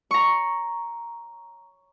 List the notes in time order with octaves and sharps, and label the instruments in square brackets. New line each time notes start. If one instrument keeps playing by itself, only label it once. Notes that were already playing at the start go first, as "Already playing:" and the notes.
[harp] A#5 C#6